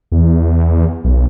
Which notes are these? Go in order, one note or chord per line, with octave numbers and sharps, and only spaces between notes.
E2
B1